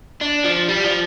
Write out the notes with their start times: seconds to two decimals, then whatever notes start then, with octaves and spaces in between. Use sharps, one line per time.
0.21 D4
0.44 F3
0.68 G3
0.84 F3